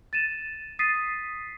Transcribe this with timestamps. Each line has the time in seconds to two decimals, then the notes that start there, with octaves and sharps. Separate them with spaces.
0.13 A6 D#7 E7
0.79 D#6 A6 B6 C7 D#7